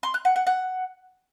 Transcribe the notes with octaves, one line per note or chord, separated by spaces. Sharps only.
C6
F#6
F#5
F#5
F#5